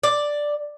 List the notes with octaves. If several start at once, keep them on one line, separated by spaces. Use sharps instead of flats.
D5